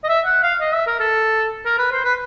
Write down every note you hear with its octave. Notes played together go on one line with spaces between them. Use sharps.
D#5
E5
F#5
F5
D#5
E5
A#4
A4
A#4
B4
C5
B4